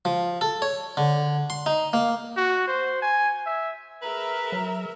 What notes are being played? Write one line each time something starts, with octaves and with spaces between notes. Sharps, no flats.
F3
A4
C#5
D3
C6
D#4
A#3
F#4
C5
G#5
E5
G#4 A#4 B4 E5 A#5
F#3